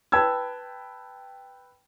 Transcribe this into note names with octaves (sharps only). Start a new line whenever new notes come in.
B4 G5 A5 B5 E6 G#6